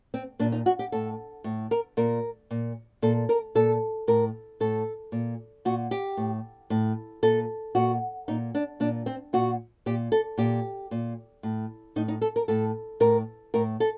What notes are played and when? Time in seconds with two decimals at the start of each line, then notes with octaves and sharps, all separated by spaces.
0.14 C4
0.39 A#2 D4
0.52 D#4
0.66 F#4
0.79 G4
0.92 A2 A4
1.44 A2
1.71 A#4
1.97 A#2 A#4
2.51 A#2
3.02 A#2 A4
3.29 A#4
3.55 A#2 A4
4.08 A2 A#4
4.60 A2 A4
5.12 A#2
5.65 A#2 F#4
5.91 G4
6.17 A2
6.70 A2
7.23 A#2 A4
7.75 A#2 F#4
8.28 A#2 D#4
8.55 D4
8.80 A#2 D4
9.06 C4
9.33 A#2 F#4
9.86 A#2 G4
10.12 A4
10.38 A#2 G4
10.91 A#2
11.43 A2
11.96 A2 D#4
12.08 D#4
12.21 A4
12.36 A#4
12.48 A2 A4
13.00 A2 A#4
13.54 A2 A#4
13.80 A4